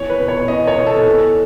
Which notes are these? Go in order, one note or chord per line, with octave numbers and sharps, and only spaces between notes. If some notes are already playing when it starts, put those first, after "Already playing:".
Already playing: E2 C#5
B4
B2
C#5
E2 D#5
C#5
B2
A4
E2